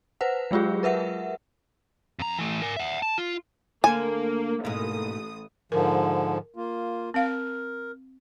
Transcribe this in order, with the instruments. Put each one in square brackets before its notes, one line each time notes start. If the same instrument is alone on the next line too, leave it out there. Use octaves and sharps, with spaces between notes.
[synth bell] B4 C5 F#5
F#3 G#3 F4 G4 G#4
A#4 B4 E5 F#5
[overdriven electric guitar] F2 A#5
E3 A3
A#4 G#5
E5 F#5
A5
F4
[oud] D2 A4 C5 [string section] A#3 [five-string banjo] G#5
[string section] A1 D#6 [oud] G#2 B2 A#3
[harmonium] G#2 D3 F3 [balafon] A#4
[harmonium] A#3 F4
[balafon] C4 F5 [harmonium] A#4